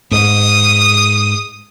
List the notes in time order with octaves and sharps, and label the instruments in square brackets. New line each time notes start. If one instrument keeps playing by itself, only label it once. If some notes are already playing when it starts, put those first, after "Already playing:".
[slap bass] G#2 [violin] D#6